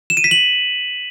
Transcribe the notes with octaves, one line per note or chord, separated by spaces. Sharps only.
E7
D#7
B6
F#7